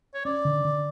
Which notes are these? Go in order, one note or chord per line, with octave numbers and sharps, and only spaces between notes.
C#5
C#4 D5
D3
D3